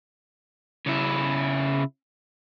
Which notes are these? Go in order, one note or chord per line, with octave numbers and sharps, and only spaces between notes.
C#3 E4